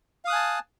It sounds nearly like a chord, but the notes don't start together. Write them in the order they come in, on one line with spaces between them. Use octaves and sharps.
F5 D#6 F#6 G#5 A5